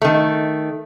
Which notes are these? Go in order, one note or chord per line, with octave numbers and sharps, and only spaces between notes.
D#3 A3